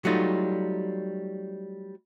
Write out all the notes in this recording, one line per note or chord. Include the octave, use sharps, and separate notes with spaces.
F#3 G3 A3 D#4 F4